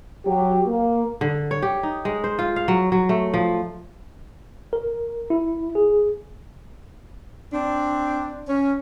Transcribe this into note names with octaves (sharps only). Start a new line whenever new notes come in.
F#3 G4
A#3
D3
C#5
G4
D#4
G#3
C5
F4
F5
F#3
F#3
A3
F3
A#4
E4
G#4
C4 D4
C#4